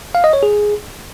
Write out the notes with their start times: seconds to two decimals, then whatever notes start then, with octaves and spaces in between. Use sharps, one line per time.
0.15 F5
0.24 D#5
0.33 C#5
0.43 G#4